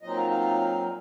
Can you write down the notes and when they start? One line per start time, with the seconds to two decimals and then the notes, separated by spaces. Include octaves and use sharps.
0.02 A#2 F#3 C4 D#4 D#5
0.17 F5
0.30 F5